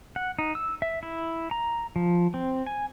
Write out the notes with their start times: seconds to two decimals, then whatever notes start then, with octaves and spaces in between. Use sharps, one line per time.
0.16 F#5
0.39 D#4
0.55 E6
0.82 E5
1.03 E4
1.51 A#5
1.96 F3
2.34 C4
2.66 G#5